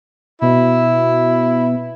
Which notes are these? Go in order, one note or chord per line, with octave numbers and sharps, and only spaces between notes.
B2 E4